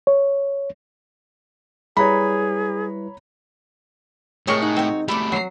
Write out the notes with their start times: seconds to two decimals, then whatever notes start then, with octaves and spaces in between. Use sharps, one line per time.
0.07 C#5
1.97 G3 E4 G#4 B4 C#5 A#5 B5
4.47 A2 C3 G#3 A#4 C#5 D#5 G#5 C#6
4.62 D#4 F#5
4.77 C4 F#4 C#5
5.08 G3 A3 E4 D5 D6
5.32 F#3 A#5 C7